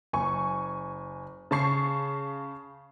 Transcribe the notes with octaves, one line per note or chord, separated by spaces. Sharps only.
F#1 G#5 C#6
C#3 A5 C#6 C7